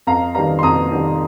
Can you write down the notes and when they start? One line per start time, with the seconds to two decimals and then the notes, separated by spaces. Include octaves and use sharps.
0.07 F2 F5 A#5
0.35 D#3 G3 F5 A#5
0.59 C6
0.63 F2 A#5 D#6
0.92 D#3 G3